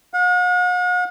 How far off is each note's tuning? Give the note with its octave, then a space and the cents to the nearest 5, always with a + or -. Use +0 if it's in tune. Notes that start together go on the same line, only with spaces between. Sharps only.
F#5 -45